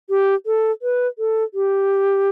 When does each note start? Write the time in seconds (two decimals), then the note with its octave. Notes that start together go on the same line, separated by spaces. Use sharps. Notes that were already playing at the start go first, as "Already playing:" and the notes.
0.10 G4
0.46 A4
0.82 B4
1.19 A4
1.54 G4